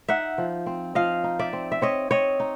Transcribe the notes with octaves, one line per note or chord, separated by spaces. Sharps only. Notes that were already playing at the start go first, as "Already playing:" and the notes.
D#4 E5 F#5
F3
C4
F3 D#5 F5
D#4
D5 E5
C4
E5
C4 C#5 D#5
C4 C#5 D#5
D#4